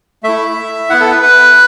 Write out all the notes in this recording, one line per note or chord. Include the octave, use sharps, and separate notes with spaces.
A3 E4 E5
B3 E4 F#5
A4
B4
B4